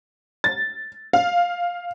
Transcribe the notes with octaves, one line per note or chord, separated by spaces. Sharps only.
A6
F5